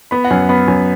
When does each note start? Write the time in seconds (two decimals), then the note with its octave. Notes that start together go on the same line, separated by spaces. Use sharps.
0.11 B3 B5
0.24 F#5
0.30 F#2 G#5
0.49 B3 B5
0.67 F#2 G#5